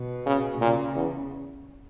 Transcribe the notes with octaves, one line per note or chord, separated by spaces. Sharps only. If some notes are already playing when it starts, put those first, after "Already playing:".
Already playing: B2
C#3
A#2 C#3
E2